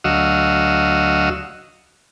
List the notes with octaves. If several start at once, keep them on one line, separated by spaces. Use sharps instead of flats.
D2 F#3 F#4 D#5 F5 E6